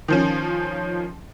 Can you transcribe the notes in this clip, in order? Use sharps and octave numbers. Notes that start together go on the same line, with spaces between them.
D#3 F3 C#4